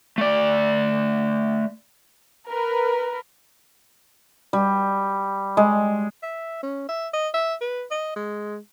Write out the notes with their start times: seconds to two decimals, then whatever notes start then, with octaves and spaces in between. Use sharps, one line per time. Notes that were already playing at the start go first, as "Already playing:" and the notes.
0.18 A3 D5
2.48 A#4 B4
4.53 G3
5.57 G#3
6.23 E5
6.63 C#4
6.88 E5
7.13 D#5
7.34 E5
7.61 B4
7.91 D#5
8.16 G#3